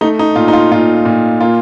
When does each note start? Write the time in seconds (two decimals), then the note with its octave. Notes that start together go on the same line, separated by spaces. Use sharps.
0.01 A3 D#4
0.19 D#4
0.36 A#2 F4
0.48 D#4
0.53 F4
0.71 A#2 F4
1.05 A#2
1.41 A#3 F4